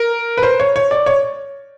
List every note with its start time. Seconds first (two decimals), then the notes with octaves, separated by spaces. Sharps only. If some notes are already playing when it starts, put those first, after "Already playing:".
Already playing: A#4
0.37 B4
0.43 C5
0.60 C#5
0.76 C#5
0.91 D5
1.06 C#5